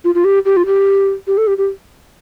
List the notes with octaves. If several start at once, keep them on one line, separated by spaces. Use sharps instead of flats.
F4
F4
G4
G4
F4
G4
G4
A4
G4
G4